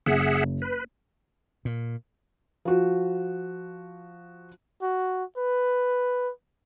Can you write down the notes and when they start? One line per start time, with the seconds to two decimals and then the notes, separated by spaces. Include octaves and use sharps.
0.06 F#1 G#4 E5 F#5
0.62 B4
1.65 A#2
2.65 F3 F#4
4.82 F#4
5.37 B4